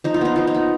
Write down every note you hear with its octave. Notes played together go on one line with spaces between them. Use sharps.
F3 D#4
F4
B3 D#4
F3 F4
D#4
B3